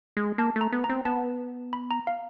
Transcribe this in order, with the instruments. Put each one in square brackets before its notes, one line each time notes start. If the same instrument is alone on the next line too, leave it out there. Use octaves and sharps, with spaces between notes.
[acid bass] G#3
[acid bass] A#3 [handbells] A5
[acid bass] A3
[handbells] A#5
[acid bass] B3
[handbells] A#5
[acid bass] C4
[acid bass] B3 [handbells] A5
[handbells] B5
A#5
F5